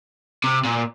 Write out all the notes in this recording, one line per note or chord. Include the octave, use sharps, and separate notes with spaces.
C3
A#2